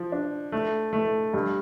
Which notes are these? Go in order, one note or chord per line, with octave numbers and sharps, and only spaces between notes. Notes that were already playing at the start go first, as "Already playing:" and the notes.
Already playing: F3
D4
A3
A3
G2